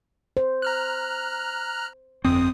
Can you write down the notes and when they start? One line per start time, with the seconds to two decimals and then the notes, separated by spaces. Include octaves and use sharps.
0.37 C5
0.62 A#5 F6 F#6
2.25 G1 F2 C4 D#6